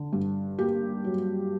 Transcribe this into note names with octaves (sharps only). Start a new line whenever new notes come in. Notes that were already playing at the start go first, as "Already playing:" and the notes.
Already playing: D3
G2
A#3 G4
F#3